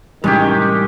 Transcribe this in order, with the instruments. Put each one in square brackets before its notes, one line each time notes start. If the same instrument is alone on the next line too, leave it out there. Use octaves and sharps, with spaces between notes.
[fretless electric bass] A1 C3 E3 [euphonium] D#3 [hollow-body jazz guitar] G3 [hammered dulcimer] G#3 C#4 G4